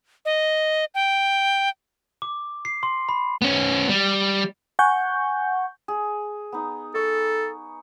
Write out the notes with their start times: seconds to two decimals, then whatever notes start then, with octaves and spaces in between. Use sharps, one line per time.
0.25 D#5
0.95 G5
2.22 D6
2.65 C7
2.83 C6
3.09 B5
3.42 B3 C#4
3.89 G3
4.79 F#5 G#5 C#6 G6
5.88 G#4
6.52 B3 D#4
6.95 A4 C#6